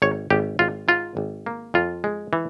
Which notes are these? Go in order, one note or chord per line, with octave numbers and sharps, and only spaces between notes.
G#1 C#5
G#1 G4
G#1 F4
G#2 F4
G#1
A#3
F2 F4
G#3
E3